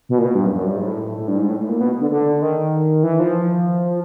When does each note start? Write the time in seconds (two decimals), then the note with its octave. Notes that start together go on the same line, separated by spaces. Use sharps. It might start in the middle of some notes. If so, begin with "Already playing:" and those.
0.09 B2
0.18 A#2
0.25 B2
0.35 G2
0.45 F#2
0.55 F#2
0.66 G2
0.76 G#2
0.87 A2
1.18 A2
1.28 G2
1.38 G#2
1.49 A2
1.59 A2
1.69 A#2
1.80 B2
2.00 D3
2.11 D3
2.42 D#3
3.03 E3
3.20 F3